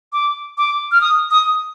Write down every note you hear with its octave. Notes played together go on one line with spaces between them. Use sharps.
D6
D6
F6
D#6
D#6